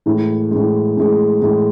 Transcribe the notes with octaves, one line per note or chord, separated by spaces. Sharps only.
A2 E3 G#3
A2 E3 G#3
A2 E3 G#3
A2 E3 G#3